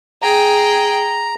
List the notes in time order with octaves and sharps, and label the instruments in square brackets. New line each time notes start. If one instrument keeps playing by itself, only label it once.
[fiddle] G#4 G5 [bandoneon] A#5